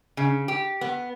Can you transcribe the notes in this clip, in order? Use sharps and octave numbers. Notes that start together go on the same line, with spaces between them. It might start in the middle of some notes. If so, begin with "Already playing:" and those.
C#3
G4
B3